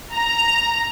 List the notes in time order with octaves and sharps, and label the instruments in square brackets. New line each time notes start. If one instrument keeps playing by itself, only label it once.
[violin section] A#5